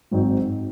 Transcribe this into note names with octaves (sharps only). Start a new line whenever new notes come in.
G#1 G#2 F#3 C4 D#4